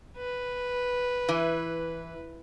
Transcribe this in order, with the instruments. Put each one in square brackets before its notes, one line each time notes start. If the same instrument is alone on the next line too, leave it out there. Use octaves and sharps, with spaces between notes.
[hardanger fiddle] B4
[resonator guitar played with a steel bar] E3